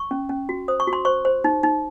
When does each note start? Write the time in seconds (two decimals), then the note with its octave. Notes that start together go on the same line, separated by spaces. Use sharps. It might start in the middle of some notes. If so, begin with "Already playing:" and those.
Already playing: C#6
0.11 C#4
0.29 C#4
0.49 F#4
0.68 C5 D#6
0.80 C#6
0.87 F#4
0.93 C6
1.05 C5 C#6
1.25 C5
1.44 D#4
1.63 D#4